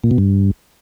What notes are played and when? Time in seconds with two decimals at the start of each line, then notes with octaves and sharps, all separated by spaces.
0.04 A#2
0.11 B2
0.18 G2